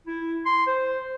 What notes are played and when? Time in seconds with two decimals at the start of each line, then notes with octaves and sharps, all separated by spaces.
0.07 E4
0.46 C6
0.67 C5